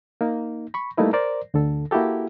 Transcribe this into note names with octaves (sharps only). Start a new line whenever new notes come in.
A#3 D#4
B5 C#6
G3 A3 A#3 D#4 E4 B4
A#4 C5 D5
D2 D3 A4
A#3 E4 F#4 G4 A4